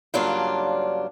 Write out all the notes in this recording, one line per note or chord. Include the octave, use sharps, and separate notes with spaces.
G2 C#3 F#3 A#3 D4 F4